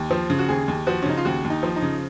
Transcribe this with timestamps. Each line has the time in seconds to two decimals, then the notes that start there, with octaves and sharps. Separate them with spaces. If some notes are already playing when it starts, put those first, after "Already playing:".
Already playing: D#2
0.11 F3
0.30 C#3
0.39 F#4
0.49 D#2 G#4
0.68 D#2
0.87 F3 F#4
1.02 C#4
1.06 C#3 D#4
1.17 F4
1.25 D#2 F#4
1.44 D#2
1.50 D#4
1.63 F3
1.76 D#4
1.82 C#3